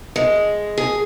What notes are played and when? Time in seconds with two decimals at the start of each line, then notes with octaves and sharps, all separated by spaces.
0.16 G#3
0.78 G#4